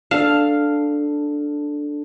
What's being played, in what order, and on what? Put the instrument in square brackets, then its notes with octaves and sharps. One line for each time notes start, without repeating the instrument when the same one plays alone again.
[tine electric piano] D4 A4 [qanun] F5